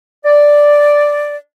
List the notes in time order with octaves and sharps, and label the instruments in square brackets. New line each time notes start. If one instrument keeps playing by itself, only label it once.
[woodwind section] D5